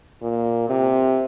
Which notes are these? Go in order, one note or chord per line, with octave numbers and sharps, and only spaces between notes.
A#2
C3